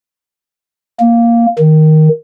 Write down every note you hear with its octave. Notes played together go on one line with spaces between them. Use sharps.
A#3
D#3